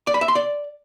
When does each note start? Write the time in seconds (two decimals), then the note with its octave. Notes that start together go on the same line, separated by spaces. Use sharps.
0.07 D5
0.14 B5
0.21 E5
0.28 C6
0.35 D5